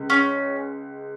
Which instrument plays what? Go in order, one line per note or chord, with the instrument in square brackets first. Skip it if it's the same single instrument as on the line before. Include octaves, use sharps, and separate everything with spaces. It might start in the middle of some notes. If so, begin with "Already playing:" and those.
Already playing: [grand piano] C#2 C#3 G#3
[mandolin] C#4